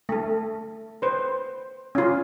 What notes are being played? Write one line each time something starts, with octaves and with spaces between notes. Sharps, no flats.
A3 A4
B4 C5
C#4 F4